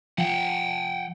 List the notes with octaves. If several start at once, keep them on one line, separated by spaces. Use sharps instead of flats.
F3 F#5 G5